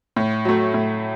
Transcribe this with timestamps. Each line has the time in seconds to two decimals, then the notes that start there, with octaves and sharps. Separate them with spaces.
0.16 A2
0.45 F#3 A3
0.74 A2